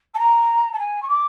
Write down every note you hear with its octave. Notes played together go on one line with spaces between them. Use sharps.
A5
A#5
A5
G#5
C#6
D6